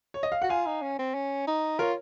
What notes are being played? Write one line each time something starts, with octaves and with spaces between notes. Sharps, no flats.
C#5
D#5
F5
F#4 F#5
F4 F5 G#5
D#4
C#4
C4
C#4
D#4
F4 A#4 C#5